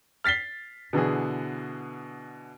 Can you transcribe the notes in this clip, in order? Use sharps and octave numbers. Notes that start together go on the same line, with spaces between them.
F6 A6 B6 C7 G7
B2 D3 E3 G#4